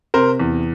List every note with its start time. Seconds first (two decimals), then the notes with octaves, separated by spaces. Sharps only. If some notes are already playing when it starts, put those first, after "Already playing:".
0.14 C3 A#4 C5
0.39 E2